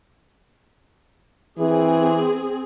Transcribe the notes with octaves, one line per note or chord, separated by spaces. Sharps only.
E3 C4 G#4